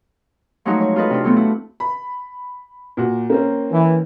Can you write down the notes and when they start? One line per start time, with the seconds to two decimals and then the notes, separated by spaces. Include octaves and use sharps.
0.65 F3 F#3 G#3 A3 D#4 F#4
0.81 C#5
0.96 F4 F#4 A4 B4 D#5
1.10 C3 D4 F4
1.24 F#3 A3 B3 C4
1.36 E4 F#4
1.80 B5
2.97 A#2 F#4
3.30 A#3 C4 C#4
3.71 E3